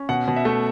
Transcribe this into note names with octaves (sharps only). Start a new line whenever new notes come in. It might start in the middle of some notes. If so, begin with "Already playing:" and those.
Already playing: C#4
B2 F#5
B2
E5
A3